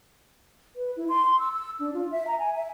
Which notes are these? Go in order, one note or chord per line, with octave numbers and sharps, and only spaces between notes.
B4
E4
C6
C6
E6
E6
D4
F4
E5
A#5
G#5
E5